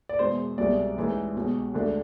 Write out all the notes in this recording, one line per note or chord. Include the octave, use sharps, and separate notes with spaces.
D5
E1 E2 B2 G#3 C5
C2 B2 G#3 D5
A1 G#2 E3 G#3
B1 B2 G#3
D2 D3 G#3